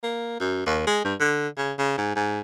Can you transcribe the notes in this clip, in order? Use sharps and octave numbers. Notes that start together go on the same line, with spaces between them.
A#3
F#2
D#2
G#3
G2
D3
C#3
C#3
G#2
G#2